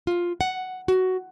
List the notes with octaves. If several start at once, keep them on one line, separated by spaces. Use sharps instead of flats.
F4
F#5
F#4